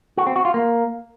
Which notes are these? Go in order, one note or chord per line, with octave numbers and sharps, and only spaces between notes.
F#4
C4
F#4
F4
A#3